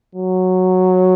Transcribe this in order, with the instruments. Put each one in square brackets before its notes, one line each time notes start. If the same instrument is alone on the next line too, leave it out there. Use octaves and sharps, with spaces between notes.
[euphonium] F#3